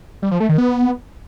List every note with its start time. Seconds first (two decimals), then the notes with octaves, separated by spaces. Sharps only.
0.22 G3
0.31 F3
0.40 A3
0.49 D#3
0.58 B3